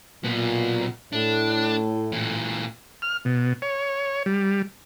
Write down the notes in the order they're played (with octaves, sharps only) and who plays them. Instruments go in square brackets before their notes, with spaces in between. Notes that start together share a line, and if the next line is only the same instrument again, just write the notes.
[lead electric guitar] B1 B3 [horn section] A#2
[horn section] A2 [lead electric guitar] D4
[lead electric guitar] A#2 E3
[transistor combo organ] F6
B2
C#5
G3